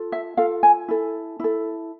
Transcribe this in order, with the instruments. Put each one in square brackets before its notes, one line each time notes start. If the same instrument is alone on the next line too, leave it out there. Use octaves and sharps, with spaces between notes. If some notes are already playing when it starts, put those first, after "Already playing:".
Already playing: [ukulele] F4 A4
E5
F4 A4 F5
G#5
E4 A4
E4 A4